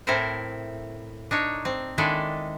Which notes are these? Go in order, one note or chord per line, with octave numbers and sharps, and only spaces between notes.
A2 C4 E4 A4 A#4 C5
D4 D#4 C#5
C4
D#3 G#3 D4 E4 A4 D5